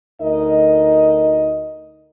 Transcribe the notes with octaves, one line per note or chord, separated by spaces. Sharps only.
D2 D#4 A#4 D#5